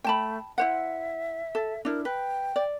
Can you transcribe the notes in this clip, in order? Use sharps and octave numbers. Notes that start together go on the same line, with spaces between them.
A3 G5 A5 B5
E4 C5 E5 F#5
A4
D4 E4 A#4
B4 G5
D5